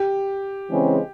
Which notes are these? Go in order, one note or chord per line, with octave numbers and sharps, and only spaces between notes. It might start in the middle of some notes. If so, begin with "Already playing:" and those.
Already playing: G4
C#3 E3 G#3 C4